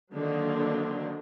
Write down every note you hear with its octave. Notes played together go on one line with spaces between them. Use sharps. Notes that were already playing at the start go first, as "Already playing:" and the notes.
D3 D#3 F#3 A#3 C4 D4